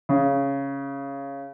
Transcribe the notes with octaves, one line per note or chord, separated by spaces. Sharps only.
C#3